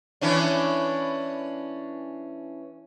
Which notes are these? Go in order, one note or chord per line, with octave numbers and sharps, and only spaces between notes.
E3 C#4 D4